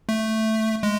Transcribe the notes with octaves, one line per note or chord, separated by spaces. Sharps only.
A3
G#3